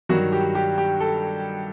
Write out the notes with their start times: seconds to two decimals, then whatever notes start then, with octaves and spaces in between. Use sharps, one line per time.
0.09 G2 D#3 F#3 F#4
0.33 G4
0.55 G4
0.78 G4
1.00 A4